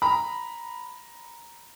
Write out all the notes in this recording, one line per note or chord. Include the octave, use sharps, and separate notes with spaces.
A#5 B5